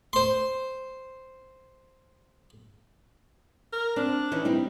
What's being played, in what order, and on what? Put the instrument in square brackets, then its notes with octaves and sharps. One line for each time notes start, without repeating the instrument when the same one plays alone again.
[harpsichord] C5 C6
[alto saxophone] A#4
[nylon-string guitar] C4 [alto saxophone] D4
[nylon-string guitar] E3 C#4 D#4
G3 C4 D#4